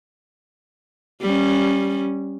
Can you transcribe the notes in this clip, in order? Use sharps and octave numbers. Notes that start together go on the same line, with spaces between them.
G3 C#4